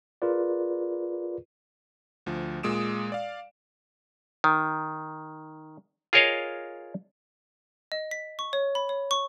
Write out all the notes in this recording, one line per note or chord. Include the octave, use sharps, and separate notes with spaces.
F4 G#4 A#4 B4 D5
D2 F3
A#2 G#3 D#6 D7 E7
D5 F5
D#3
F4 G#4 A#4 C#5 D#5 F5
D#5
B6
C#6
C#5
B5
C#5
C#6